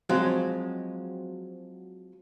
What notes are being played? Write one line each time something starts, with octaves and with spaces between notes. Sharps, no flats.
F3 F#3 G#3 C4